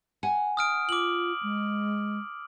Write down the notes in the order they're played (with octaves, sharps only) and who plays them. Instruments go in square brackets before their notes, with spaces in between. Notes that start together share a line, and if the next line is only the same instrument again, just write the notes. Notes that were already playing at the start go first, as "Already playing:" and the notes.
[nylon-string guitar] F#5 G#5
[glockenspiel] D#6 F6 D7
[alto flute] F4 [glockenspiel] D6 F#7
[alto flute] G#3